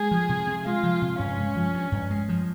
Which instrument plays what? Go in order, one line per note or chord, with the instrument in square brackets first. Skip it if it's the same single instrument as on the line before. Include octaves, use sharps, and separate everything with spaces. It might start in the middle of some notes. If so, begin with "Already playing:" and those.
Already playing: [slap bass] G#3 [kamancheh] G#4
[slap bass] F3
C3
C3
[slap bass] G#3 [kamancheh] F4
[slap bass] F3
C3
[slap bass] G2 [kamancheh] C#4
[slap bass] G#3
F3
G2
G2
G#3
F3